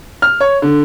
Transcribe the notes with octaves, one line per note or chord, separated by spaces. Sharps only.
F6
C#5
D3